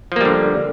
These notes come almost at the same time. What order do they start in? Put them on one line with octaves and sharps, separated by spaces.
F3 A#3 G3 D3